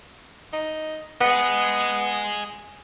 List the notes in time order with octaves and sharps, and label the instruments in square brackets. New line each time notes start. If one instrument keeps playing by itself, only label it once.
[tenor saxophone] D#4
[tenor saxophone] B3 [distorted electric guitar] G#4 D#5